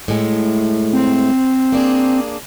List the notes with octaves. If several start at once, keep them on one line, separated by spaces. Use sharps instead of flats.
A2 G#3 A3
C4
A#3 D4 G#4